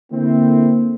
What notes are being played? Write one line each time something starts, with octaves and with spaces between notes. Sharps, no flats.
D3 A#3 C4 E4